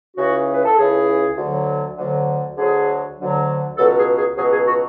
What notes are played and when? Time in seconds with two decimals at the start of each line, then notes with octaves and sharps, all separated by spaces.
0.16 C#2 C#3 E3 F#4
0.51 B4
0.64 A4
0.77 C#2 C#3 E3 G#4
1.36 D2 D3 F#3
1.97 D2 D3 F#3
2.57 D2 D3 F#3 G#4
3.17 D2 D3 F#3
3.77 C#2 B2 F#3 A4
3.97 G#4
4.16 G#4
4.37 C#2 B2 F#3 G#4
4.52 G#4
4.67 F#4